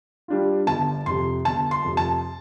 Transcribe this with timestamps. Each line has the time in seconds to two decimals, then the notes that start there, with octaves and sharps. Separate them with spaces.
0.28 G3 D4 F4
0.67 G1 A5
1.05 F2 C3 C6
1.45 G1 A5
1.71 C6
1.84 F2 C3
1.97 A5